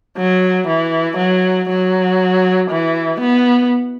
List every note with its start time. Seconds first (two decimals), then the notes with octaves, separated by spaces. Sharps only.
0.18 F#3
0.67 E3
1.18 F#3
1.69 F#3
2.71 E3
3.20 B3